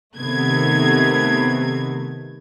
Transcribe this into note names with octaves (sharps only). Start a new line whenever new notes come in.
C3 D#3 A3 B3 G#6